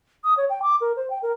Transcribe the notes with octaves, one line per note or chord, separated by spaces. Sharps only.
D#6
C#5
G5
D6
A#4
C5
G5
A#4